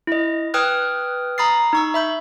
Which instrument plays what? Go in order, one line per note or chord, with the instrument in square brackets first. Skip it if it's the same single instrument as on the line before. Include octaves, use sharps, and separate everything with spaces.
[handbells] E4 D#5
B4 G5 D#6 F6 F#6 G#6
A#5 B5 D#6 A6 C7
D#4 C#6 E6
E5 B5 G6